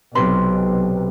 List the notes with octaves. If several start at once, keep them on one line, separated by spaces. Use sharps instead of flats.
B1 C3 B4 C6